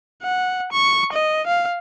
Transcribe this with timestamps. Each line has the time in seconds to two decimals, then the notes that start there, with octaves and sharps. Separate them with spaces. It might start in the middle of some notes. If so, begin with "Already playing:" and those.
0.23 F#5
0.72 C#6
1.13 D#5
1.47 F5